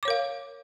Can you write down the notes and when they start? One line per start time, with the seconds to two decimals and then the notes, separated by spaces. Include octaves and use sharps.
0.03 D6
0.05 C#5
0.08 A#4
0.10 F5